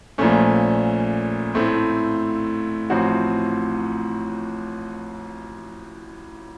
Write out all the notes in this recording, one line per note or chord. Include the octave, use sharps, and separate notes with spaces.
A#1 A#2 A3 C#4
A2 A3 C4
A1 A2 F3 C4 F#4